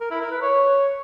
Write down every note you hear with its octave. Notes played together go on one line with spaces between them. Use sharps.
A#4
E4
A#4
B4
C#5